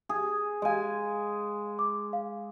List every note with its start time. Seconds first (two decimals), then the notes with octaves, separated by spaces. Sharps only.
0.09 G#4
0.62 G#3 D#5 F5 G#5
1.79 D6
2.13 F5